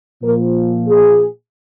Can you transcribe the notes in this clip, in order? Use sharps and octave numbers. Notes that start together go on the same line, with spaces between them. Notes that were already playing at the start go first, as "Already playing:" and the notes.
A#2 F3 A#4
G#4